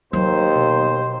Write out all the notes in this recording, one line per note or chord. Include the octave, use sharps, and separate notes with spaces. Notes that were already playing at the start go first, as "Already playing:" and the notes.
D#2 F#3 C5
B2